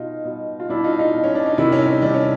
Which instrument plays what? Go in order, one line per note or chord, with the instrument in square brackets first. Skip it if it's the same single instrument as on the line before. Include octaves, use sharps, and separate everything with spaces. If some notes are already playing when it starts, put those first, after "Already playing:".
Already playing: [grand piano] B2 D#4 F4
B2
F4
B2 D4 E4
D#4 F4
D#4 F4
B2
C#4
D4
D#4
C3 D#3 D4 E4
C#4 D#4
C#4
C3 D#3 D4
C#4